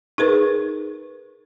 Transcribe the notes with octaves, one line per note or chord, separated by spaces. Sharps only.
D#4 G#4 A#4 B4